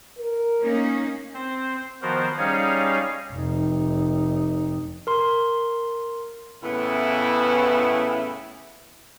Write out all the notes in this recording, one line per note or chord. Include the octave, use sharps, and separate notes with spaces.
A#4
A#3 C#4 D#4
C4 C5
D#3 F3 B3 F#4 A#4 C5
G3 C#4 D#4 G#4 C#5 F5
F1 D#4
A#4 C6
A2 C#3 E3 B3 E4